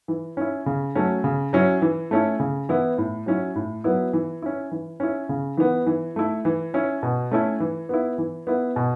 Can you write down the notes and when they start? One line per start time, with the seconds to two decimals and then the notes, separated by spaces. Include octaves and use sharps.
0.08 E3
0.37 C#4 E4
0.66 C#3
0.95 F#3 A3 C#4
1.24 C#3
1.53 F#3 C#4 E4
1.82 E3
2.11 A3 C#4 E4
2.40 C#3
2.69 E3 B3 E4
2.98 A2
3.26 F#3 C#4 E4
3.56 A2
3.84 F#3 B3 E4
4.13 E3
4.42 C#4 E4
4.71 E3
5.00 C#4 E4
5.29 C#3
5.57 E3 B3
5.87 E3
6.16 A3 E4
6.45 E3
6.74 C#4 E4
7.03 B2
7.31 A3 C#4 E4
7.60 E3
7.89 B3 E4
8.18 E3
8.47 B3 E4
8.76 B2